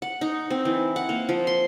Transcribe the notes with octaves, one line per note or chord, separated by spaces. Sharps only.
F#5
D#4
C4
E3
F#5
A#3
F3
C6